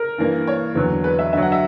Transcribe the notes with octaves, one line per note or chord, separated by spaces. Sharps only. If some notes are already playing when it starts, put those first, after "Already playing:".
Already playing: A#4
G2 E3 A#3
C#5
E2 D3 F#3
B4
E5
G2 D3 F#3 E5
F#5
E5